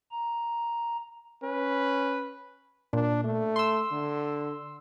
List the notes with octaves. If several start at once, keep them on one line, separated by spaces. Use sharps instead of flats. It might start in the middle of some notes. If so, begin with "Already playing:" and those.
A#5
C#4 B4
A#2 D4
A3
C6 E6
D3